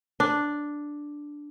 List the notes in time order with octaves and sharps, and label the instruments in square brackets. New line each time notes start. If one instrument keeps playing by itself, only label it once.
[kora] D4